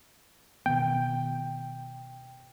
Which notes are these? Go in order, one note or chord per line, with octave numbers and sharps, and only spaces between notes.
B2 D#3 B3 G5